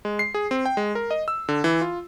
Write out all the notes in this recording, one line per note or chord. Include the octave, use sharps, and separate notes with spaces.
G#3
C7
G#4
C4
G5
G#3
A#4
D#5
E6
D3
E3
F4